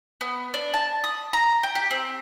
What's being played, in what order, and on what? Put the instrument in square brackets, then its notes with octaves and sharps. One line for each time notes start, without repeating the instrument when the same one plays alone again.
[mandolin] B3
D4
A5
D#6
A#5
G5
G4
C4